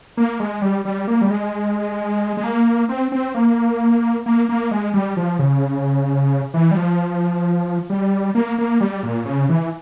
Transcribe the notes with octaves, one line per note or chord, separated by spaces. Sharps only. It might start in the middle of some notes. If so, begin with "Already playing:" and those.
A#3
G#3
G3
G3
A#3
G3
G#3
G#3
A#3
C4
C4
A#3
A#3
A#3
G#3
G3
F3
C#3
E3
G3
F3
G3
A#3
A#3
G3
A#2
C#3
E3